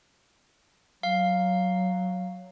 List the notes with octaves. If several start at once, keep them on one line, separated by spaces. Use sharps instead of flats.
F#3 F5